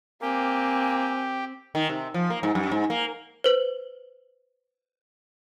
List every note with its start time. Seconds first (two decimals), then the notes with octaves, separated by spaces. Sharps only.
0.22 A#3 C4 G4 G#5
1.75 D#3
1.89 C3
2.14 F3
2.30 A#3
2.43 G#2
2.55 F#2
2.71 G#2
2.90 A#3
3.44 B4 C5